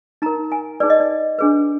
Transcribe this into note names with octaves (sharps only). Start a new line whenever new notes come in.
D#4 A#4 A#5
G#5
D#4 G#4 B4 D5
D#5
D5
D4 G#4 B4